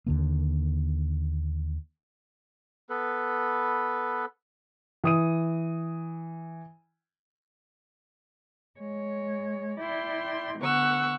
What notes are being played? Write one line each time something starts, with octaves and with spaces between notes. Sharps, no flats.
D#2 D3 A#3
B3 A4 B4
E3 D#6 D#7
G#3 C#5
E4 D5 G5 C6
D3 B3 F#5 C#6 E6